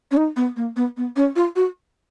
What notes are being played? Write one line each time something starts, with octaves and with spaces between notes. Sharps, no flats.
C#4
D#4
B3
A#3
B3
B3
C#4
F4
F#4